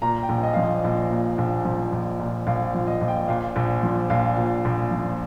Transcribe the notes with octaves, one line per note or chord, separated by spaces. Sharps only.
A#2 A#5
G5
A#1
D#5
F3 F5
D#5
A#1
A#2
A#1
F3
A#1
A#2
A#1 F5
F3
D#5
A#1
G5
A#2 F5
A#1
F3
A#1 F5
A#2
A#1
F3